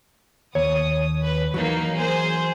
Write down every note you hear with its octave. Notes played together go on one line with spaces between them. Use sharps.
D#2 C#5 D#6
B4
E3 F#3 A#3 D#4
G#4 C5